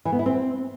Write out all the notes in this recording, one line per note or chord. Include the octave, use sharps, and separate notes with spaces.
E3
B3
E4
C4